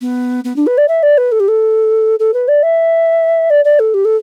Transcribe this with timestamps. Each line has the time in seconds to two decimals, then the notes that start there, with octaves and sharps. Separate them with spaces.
0.01 B3
0.44 B3
0.56 D4
0.66 B4
0.77 D5
0.88 E5
1.03 D5
1.17 B4
1.32 A4
1.40 G4
1.48 A4
2.19 A4
2.33 B4
2.48 D5
2.63 E5
3.50 D5
3.64 D5
3.79 A4
3.94 G4
4.05 A4